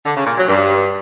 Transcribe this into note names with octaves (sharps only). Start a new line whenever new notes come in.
D3
C#3
A#2
F#3
G2